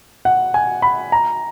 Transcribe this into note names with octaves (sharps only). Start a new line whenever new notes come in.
F#5
G#5
B5
A#5